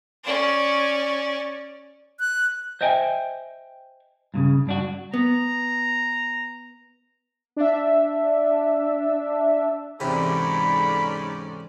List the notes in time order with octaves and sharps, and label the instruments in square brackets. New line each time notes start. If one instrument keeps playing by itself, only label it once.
[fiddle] C#4 D5
[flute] F#6
[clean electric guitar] C5 D#5 E5 G5 G#5
G2 A#2 C#3
G2 D4 F#4
[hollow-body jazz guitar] B3 [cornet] A#5
[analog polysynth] D4 E5
[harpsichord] E2 C3 [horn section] G#2 C#4 [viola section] A4 D5 [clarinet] B5